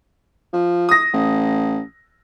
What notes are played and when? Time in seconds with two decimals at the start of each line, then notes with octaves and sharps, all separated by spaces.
0.53 F3
0.89 D#6 A#6
1.13 A1